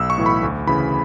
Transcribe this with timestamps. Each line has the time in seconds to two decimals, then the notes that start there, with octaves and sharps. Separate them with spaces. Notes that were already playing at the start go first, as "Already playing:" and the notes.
Already playing: B1 E6
0.10 C#6
0.18 A2 E3
0.26 B5
0.43 D2
0.67 C#3 E3 B5